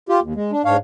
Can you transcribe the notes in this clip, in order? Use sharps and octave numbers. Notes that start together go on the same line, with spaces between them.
F4 G4
D#2
G#3
D4
G#2 D4 C#5 F5